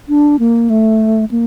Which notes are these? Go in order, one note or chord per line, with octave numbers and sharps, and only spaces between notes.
D4
A#3
A3
A#3